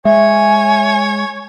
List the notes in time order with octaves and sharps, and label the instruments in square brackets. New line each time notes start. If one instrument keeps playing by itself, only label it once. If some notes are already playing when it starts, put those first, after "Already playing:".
[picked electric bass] G#3 [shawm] C#5 [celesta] E5 [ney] G#5